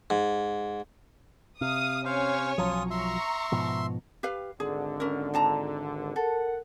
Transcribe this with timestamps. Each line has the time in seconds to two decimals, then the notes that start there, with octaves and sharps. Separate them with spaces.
0.10 G#2
1.61 C3 F5 D#6
2.05 C#4 C5 C#5 F5 G#5
2.58 B1 F3 F#3 F4 D#6
2.91 E5 A#5 C6 C#6
3.52 G#2 B2 F3
4.23 G4 B4 F5
4.60 G#1 D3 G#4
5.00 C#4 A#4
5.34 D4 A5 A#5
6.16 A4 A#4 F#5